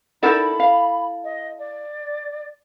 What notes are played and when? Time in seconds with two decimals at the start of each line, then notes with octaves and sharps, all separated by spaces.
0.23 D#4 E4 A4 A#4 D5 F#5 B5
0.60 F5
1.24 D#5
1.59 D5